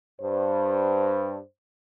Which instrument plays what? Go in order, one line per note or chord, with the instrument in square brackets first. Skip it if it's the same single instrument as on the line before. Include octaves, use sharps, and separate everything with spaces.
[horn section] G2 [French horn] C5